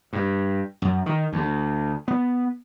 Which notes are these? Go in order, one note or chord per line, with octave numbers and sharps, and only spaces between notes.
G2
F#2
D#3
D2
B3